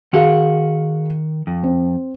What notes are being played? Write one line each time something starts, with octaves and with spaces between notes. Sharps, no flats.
D#3 F#4 G#4 F5 F#5
F2
C4